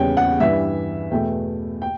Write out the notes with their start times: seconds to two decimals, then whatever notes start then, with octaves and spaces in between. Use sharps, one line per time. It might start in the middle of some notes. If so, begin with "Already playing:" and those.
Already playing: E2 C#3 G3 C#5 G5
0.17 F#5
0.40 G2 E3 G3 E5
1.11 E2 B2 A3 G5
1.82 G5